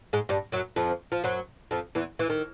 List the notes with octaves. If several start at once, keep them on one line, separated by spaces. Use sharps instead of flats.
G#2 G#3
G2 G3
F#2 F#3
F2 F3
F3
F#2 F#3
F2 F3
E2 E3
E3
D#3